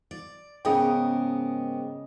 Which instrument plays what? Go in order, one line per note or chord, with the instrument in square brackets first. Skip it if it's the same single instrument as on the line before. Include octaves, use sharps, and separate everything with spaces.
[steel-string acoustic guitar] D5
[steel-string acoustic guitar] G#2 B3 A#4 [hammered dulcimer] C#3 D#5 D6 [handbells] G#4 G5